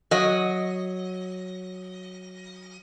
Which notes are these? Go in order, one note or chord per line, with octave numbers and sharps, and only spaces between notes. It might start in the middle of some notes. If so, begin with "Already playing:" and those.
F#3 D#5